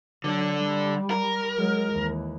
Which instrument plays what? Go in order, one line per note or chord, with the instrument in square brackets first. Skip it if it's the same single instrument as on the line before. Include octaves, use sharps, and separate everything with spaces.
[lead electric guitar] D3 D4 [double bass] F#3
[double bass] G3
[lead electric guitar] A#4
[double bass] F#3 G#3
D#2 E3